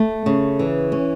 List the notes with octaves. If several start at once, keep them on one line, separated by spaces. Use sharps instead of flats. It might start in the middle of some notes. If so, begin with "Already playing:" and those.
Already playing: A3
C#3
E3
C#4